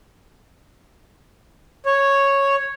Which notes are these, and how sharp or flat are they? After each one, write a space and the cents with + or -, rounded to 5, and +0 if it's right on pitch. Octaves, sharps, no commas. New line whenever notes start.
C#5 -5